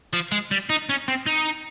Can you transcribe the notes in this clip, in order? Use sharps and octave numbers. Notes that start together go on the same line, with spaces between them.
F3
G#3
G3
D#4
C#4
C4
D#4